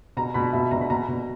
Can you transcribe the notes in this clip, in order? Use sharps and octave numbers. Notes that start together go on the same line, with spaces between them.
B2 A#5
B2 B5
B2 E5
B2 A#5
B5
B2 A#5
B2